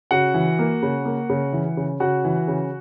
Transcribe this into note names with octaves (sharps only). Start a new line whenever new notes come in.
C#3 F#4 F#5
E3
A#3
C#3
A#3
C#3
E3
C#3
C#3 F#4 F#5
E3
C#3